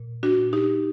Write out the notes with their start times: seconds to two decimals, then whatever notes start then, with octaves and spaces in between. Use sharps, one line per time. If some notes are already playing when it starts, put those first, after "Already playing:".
Already playing: A#2
0.23 D4 F#4
0.37 A#2
0.53 D#4 G4